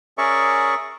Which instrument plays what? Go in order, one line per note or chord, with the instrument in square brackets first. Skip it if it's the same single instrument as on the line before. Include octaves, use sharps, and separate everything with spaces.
[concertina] C#4 G#4 A#4 D5 E5 C#6